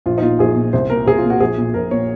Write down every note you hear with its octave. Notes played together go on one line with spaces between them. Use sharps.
A#1 F4
D#4
A#2 F4
A#1 G#4
A#2
C2 C5
A#2 A#4
C2 G#4
F4
A#2
F#4
A#1 G#4
A#2
A#1 A#4
A#2 C#5